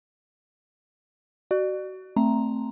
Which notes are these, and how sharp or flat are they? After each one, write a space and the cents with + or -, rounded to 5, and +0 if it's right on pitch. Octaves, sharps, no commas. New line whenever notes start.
F#4 +25 D5 +35
A3 +15 C4 +0 A#5 +0